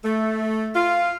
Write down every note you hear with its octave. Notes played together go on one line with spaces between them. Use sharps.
A3
F4